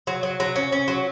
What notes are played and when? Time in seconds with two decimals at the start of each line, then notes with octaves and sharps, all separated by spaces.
0.07 F#3
0.23 F#3
0.40 F#3
0.56 C#4
0.72 C#4
0.88 F#3